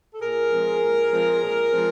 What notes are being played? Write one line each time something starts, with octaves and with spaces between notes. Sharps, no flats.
A4
A#2 G#4 A#4
F3 G#3 C4
A#2
F3 G#3 C4
A#2
F3 G#3 C4